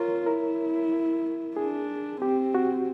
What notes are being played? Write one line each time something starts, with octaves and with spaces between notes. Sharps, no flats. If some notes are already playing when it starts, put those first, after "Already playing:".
Already playing: F4 A#4 C#5
E4 A#4
D4 G#4
C4 G4
F#4